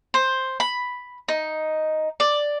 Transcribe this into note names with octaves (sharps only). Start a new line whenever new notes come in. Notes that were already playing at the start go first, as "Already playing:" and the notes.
C5
B5
D#4
D5